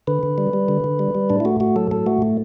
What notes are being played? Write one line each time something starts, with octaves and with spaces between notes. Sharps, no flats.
D3 B4
D3
G3
G3
D3
D3
G3
G3
A2 D4
E4
A3 F#4
A2 F#4
F#3 A4
A2 A4
A3 F#4
A2